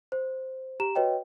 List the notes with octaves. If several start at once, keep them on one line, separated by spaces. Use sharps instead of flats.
C5
G4 A#5 E7
F#4 B4 C#5 D#5 G5